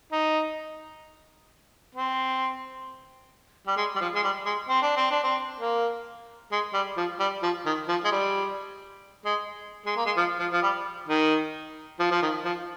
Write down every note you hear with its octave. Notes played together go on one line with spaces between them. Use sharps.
D#4
C4
G3
G#3
G3
F3
G#3
G3
G#3
C4
D4
C4
D4
C4
A#3
G#3
G3
F3
G3
F3
D#3
F3
G#3
G3
G#3
G#3
A#3
G#3
F3
F3
F3
G3
D#3
F3
F3
D#3
F3